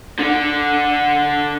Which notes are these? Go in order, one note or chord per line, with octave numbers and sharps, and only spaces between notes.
D3 D4